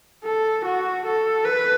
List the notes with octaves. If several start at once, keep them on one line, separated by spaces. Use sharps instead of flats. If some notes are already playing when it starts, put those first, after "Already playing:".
A4
F#4
A4
B4